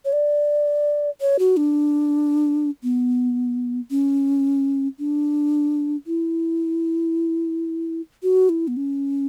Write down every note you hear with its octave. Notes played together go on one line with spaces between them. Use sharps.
C#5
D5
C#5
F#4
D4
B3
C#4
D4
E4
F#4
E4
B3
C#4